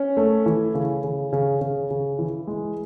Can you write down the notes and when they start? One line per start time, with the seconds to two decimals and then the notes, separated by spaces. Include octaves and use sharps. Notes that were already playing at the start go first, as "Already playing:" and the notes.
Already playing: C#4
0.17 A3
0.46 E3
0.75 C#3
1.04 C#3
1.33 C#3
1.61 C#3
1.91 C#3
2.19 E3
2.47 G#3